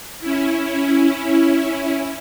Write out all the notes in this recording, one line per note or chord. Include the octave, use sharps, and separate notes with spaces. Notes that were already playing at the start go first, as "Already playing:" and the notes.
C#4 E4